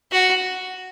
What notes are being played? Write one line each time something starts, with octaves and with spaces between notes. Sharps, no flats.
F#4